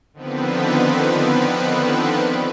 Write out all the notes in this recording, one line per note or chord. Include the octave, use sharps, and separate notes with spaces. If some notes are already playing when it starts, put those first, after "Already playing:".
D3 D#3 F3 B3 C4 B4